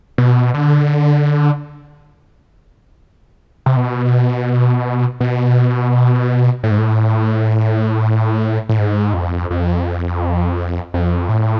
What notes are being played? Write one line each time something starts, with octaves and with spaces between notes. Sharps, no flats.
B2
D3
C3
B2
B2
A2
G#2
A2
A2
G#2
F2
F2
F2
A2